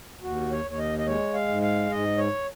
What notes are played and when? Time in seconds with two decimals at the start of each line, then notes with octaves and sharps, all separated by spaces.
0.22 D#2 F#4
0.50 C#5
0.64 D#2
0.71 C#5
0.78 D#5
0.98 D#5
1.06 G#3 C#5
1.34 F5
1.48 G#2
1.62 F5
1.90 G#2 D#5
2.17 C#5